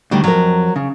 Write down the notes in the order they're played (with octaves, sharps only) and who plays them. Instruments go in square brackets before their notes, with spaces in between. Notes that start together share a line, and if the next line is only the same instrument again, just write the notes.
[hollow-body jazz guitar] D2 [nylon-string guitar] D#3 G3 D4
[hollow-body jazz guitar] F2 [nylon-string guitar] F#3 A#4
[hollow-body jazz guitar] C#3